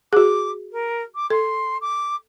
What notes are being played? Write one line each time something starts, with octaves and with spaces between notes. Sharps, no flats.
F#4 G#4 D6
A#4
D6
A4 C6
D6